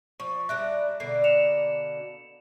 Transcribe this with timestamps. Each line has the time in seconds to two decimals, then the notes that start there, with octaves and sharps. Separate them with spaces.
0.20 F3 C#6
0.49 G3 D4 E5 A#5 F#6
1.00 B2 D3 A#3 C7
1.24 C#7 E7 F7